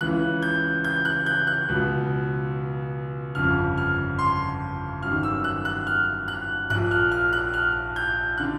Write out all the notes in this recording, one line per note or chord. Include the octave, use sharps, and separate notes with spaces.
C#2 C#3 E3 F#6
G6
G6
F#6
G6
F#6
C#2 B2
G1 F2 C#3 F6
F6
C6
G1 F#2 D#3 F6
E6
F#6
F#6
F6
F#6
A#1 A#2 F#6
F6
F6
F#6
F6
G6
D3 F#6